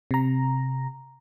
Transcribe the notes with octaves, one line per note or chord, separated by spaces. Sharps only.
C3 A#5